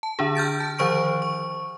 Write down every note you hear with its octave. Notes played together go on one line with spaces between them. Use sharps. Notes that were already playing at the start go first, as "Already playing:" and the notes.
A5
D3 D4 G#4
F6 G6 A6 D7
A5
D#3 F3 C5 C#6 D7
C#6